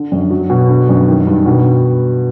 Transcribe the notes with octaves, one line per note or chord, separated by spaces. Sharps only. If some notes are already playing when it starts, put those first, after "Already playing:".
Already playing: D3
F#2
F#3
B2
D3
F#2
D#3
G2
B2